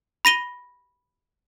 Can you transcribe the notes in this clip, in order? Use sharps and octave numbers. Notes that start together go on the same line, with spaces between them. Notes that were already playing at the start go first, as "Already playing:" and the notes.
B5 A#6 D#7 G7